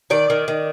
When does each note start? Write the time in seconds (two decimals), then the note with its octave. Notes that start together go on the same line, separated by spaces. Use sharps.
0.10 D#3 D5
0.30 D#3
0.48 D#3